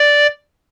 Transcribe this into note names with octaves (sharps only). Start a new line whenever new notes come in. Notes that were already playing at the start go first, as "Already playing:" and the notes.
Already playing: D5